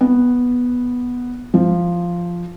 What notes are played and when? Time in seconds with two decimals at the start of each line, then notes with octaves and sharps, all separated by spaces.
0.01 B3
1.54 F3